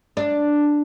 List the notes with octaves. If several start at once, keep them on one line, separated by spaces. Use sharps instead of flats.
D4